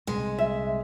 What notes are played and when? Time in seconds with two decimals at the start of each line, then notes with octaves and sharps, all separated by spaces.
0.07 C2 A#2 G#3
0.39 E5